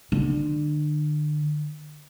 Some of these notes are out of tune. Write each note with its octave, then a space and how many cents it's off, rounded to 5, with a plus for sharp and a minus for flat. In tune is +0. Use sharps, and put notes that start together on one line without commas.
D3 +35